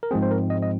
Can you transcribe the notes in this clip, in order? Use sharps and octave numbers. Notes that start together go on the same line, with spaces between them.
A#4
G#2 F3 G#3 C4 G#4
C5
A#4
D#5
D#5